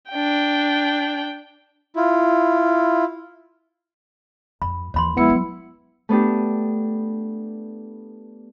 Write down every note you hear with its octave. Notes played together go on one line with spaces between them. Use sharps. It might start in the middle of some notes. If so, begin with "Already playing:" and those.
D4 G5
E4 F4
F2 B5
D#2 E3 C#5 B5 C6
F3 G#3 B3 E4 C#7
F#3
A3 B3 D4 G4